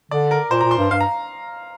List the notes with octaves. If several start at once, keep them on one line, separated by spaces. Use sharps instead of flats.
D3 D5
A#4
A#2 C5
A#5
A#2
C6
G2
G2 F5
A#5